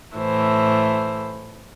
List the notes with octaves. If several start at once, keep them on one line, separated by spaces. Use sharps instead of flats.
A2 E3 A3 C5